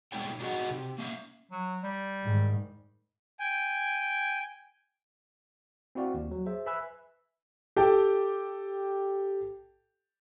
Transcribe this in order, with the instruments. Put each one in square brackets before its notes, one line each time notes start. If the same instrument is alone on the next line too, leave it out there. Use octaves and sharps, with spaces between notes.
[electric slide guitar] G2 B2 G#3 D#4 C#5 G5
D4 D#4 F#4 G#4 D#5 F#5
C3
A#3 C#4 E5 F5
[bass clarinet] F#3
G3
[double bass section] G#2 D#3
[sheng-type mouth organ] G5 G#5
[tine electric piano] C4 E4 F#4 D5 F5
D#2
F#3
G#4 C5 E5
B4 E5 G#5 B5 E6 F#6
[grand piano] G4 A4 G5 A5